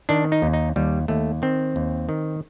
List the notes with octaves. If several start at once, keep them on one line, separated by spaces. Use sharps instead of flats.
D#3 D4
D#4
D#2
D#4
D#2 G3
D#2 A3
D#3 C4
D#2
D#3